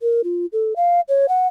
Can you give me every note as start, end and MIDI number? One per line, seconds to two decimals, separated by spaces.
0.01 0.21 70
0.24 0.46 65
0.53 0.73 69
0.76 1.01 77
1.09 1.26 73
1.29 1.47 78